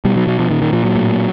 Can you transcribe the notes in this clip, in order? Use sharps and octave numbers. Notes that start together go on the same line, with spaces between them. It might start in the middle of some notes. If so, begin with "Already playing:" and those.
B2 G3
F#3
B2 F#3
F3
A#2 D#3
D#3
A#2 F3
F#3
A2